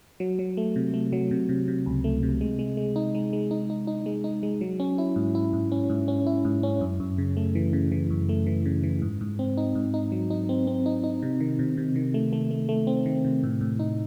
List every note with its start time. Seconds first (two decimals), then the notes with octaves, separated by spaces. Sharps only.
0.20 F#3
0.39 F#3
0.57 A3
0.76 C3
0.94 A3
1.13 F#3
1.31 C3
1.49 C3
1.68 C3
1.86 C#2
2.04 A3
2.23 C3
2.41 G#3
2.59 G#3
2.77 G#3
2.96 D#4
3.15 G#3
3.33 G#3
3.51 D#4
3.70 D#4
3.87 D#4
4.06 G#3
4.24 D#4
4.43 G#3
4.61 F#3
4.80 C#4
4.98 E4
5.16 G#2
5.35 E4
5.53 G#2
5.72 C#4
5.90 G#2
6.08 C#4
6.26 E4
6.45 G#2
6.63 C#4
6.81 F#2
7.00 F#2
7.18 C#3
7.37 A3
7.55 E3
7.73 C#3
7.92 E3
8.10 F#2
8.29 A3
8.46 E3
8.66 C#3
8.83 E3
9.02 G#2
9.21 G#2
9.39 C4
9.57 D#4
9.75 G#2
9.94 D#4
10.12 F#3
10.30 D#4
10.49 C4
10.67 C4
10.86 D#4
11.04 D#4
11.23 C3
11.40 D#3
11.59 C3
11.77 C3
11.96 D#3
12.14 A3
12.33 A3
12.51 A3
12.69 A3
12.87 C4
13.06 D#3
13.24 C3
13.43 A2
13.61 A2
13.79 D#4